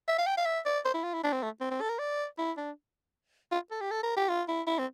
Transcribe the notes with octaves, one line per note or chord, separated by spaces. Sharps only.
E5
F5
G5
F5
E5
D5
C5
E4
F4
E4
D4
C4
A3
C4
C4
A4
A#4
D5
E4
D4
F4
A4
G4
A4
A#4
G4
F4
E4
E4
C4